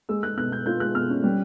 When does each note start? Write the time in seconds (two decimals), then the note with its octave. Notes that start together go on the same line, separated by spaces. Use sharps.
0.09 G#3 E6
0.23 G#3 F#6
0.37 B2 F#6
0.52 B2 G6
0.66 F4 G6
0.80 G#3 F#6
0.95 B2 F6
1.10 C#4
1.23 G3